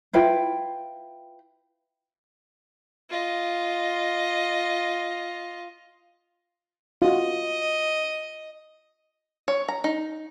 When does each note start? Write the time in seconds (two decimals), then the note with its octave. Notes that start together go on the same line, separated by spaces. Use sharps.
0.13 E4 F4 B4 G5
3.10 F4 D#5
7.02 F4 F#4 D#5
9.48 C#5
9.68 A#5
9.84 D#4